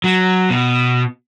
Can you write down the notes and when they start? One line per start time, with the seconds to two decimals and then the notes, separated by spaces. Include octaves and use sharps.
0.04 F#3
0.50 B2